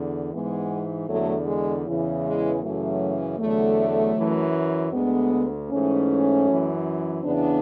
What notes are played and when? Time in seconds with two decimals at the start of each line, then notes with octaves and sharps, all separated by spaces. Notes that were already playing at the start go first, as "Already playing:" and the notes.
Already playing: E2 D3
0.32 G#2 E3 G#3 B3
1.08 E2 D3 F#3 A3
1.47 G#3
1.86 E2 C#3 E3
2.24 G#3
2.62 F#2 C#3 E3 F#3 A3
3.39 E2 D3 F#3 A3
4.16 F#2 E3
4.92 D2 D3 G#3 B3
5.69 G#2 E3 A3 C#4
6.46 F#2 E3
7.22 E2 C#3 E3 B3 D4